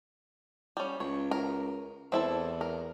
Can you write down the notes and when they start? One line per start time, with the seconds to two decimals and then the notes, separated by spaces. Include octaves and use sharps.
0.77 G3 C#4
1.00 C#2 C#5
1.31 A#4
2.12 E2 C4 E4 A4
2.61 A#4